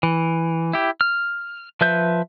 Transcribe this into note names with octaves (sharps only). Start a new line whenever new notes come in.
E3
E4 G4
F6
F3 B4 E5 G6